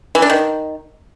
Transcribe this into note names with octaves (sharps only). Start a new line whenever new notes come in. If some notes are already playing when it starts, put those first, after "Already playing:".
E3
D4
D#3